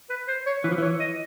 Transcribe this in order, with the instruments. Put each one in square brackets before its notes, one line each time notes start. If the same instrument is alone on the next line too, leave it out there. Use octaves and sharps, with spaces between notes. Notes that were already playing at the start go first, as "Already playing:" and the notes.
[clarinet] B4
C5
C#5
[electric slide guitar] E3 [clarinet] B4
[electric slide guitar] F3
[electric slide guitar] E3 [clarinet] C#5
[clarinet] D#5